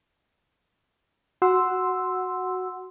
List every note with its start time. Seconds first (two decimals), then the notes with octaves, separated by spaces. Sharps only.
1.42 F#4 F#5 C6 E6